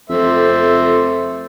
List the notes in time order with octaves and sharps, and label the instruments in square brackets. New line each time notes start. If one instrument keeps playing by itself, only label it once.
[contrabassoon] F2 [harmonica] A3 C5 E5